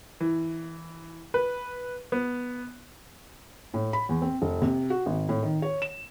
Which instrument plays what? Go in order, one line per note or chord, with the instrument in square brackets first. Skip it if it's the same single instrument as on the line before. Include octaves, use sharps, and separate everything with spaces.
[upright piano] E3
B4
B3
[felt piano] A2
B5
E2
C4
F1
C3
F#4
G#1
A2
D#3
C#5
E7